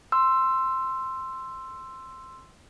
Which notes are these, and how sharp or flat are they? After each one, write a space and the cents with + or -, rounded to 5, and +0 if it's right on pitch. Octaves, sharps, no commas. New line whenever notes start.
C6 +0 E6 +15